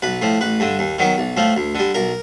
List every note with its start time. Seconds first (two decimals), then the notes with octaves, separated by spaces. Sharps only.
0.02 B1 B4
0.22 A2 F3
0.41 A1 B4
0.60 G2 D3
0.79 D#2
0.99 D#3 F#3 B3
1.18 B1
1.37 A2 F3 A3
1.57 D2
1.75 D3 G3
1.94 B1 A#4